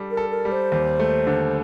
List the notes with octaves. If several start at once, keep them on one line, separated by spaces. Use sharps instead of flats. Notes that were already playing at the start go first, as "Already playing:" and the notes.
Already playing: G3 D4 A4
A#4
A4
A#4
G3
C5
D#2
A3
D3